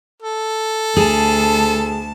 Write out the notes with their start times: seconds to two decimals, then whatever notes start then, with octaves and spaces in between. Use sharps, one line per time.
0.22 A4
0.97 D2 G#4 A5